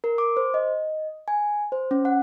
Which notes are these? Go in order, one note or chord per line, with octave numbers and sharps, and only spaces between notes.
A#4
D6
C5
D#5
G#5
C5
C#4
F#5